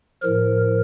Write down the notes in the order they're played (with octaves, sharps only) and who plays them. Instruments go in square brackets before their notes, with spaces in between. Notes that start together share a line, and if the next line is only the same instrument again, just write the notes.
[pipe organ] A2 F3 A#4